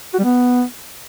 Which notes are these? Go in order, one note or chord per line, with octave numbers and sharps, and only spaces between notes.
F#4
G3
B3